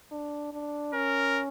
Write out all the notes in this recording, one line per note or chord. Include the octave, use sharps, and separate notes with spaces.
D4
D4
C#4 A#4